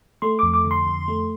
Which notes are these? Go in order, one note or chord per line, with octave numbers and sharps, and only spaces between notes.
A3 C6
D6
F2
D6
D3
C6
F2
A3